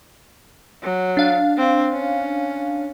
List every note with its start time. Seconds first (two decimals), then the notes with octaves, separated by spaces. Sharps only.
0.83 F#3
1.17 D4 F5
1.58 C4
1.93 C#4